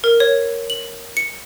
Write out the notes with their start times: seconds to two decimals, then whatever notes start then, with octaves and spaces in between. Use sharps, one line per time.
0.04 A#4
0.20 C#5
0.70 F#7
1.17 C#7